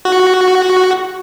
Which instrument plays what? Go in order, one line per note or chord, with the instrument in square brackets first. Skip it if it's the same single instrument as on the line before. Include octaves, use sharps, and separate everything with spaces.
[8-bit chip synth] F#4